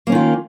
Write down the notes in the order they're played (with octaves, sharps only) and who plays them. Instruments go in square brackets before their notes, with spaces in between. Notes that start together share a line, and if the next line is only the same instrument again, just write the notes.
[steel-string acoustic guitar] A#3
C#4
D#3
F4